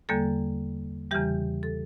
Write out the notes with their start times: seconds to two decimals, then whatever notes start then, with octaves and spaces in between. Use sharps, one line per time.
0.09 E2 D3 G3 A#3 A4
1.11 E2 C#3 E3 G3 G4
1.63 A4